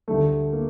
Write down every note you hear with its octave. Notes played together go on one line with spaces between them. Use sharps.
D2 D3 G3 A3
A#3